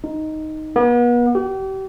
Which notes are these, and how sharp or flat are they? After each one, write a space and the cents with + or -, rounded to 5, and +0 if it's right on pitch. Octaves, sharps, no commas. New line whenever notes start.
D#4 +0
B3 -40
G4 -35